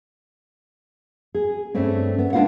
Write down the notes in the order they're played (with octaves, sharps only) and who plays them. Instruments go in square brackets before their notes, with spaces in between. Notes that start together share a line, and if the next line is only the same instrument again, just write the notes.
[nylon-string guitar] G#4
G2 A3 C4 C#4
B3
G#3 D4 D#4 F4 F5 F#5